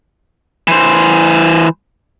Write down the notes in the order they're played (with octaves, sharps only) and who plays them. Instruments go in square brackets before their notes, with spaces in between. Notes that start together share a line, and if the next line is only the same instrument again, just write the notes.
[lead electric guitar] E3 C5